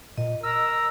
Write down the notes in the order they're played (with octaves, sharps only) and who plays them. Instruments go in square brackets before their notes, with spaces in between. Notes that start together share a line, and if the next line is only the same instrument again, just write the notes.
[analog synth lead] A#2 [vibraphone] D#5
[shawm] A#4 [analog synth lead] E6